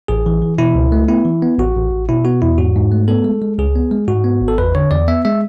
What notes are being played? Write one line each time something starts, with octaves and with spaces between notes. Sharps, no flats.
A1 G#4
E3
E3
B2 E4
C#2
A3
B3 E4
E3
B3
A1 F#4
A1
A1
B2 E4
B3 F#4
E2 E4
G#2 F#4
G#2
A3
B3 A4
G#3
G#3
C#2 G#4
B3
G#3
G#2 F#4
B3
G#1
A4
E2 B4
D3 C#5
E2 D5
B3 E5
G#3 E5